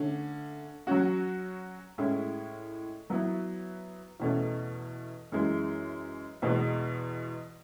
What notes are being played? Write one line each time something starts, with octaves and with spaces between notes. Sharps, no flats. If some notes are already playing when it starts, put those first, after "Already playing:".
Already playing: D3 A3 C#4
F#3 C#4 F#4
A2 G#3 C#4 E4
F#3 B3 E4
E2 B2 A3 C#4
F#2 E3 G#3
E2 B2 G#3 B3